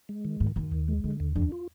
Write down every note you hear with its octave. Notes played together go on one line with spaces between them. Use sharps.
G#3
D#3
G#2 D#3
F#2 D#3
D#2
G#3
F2 D3
D#2
F2 D4
F4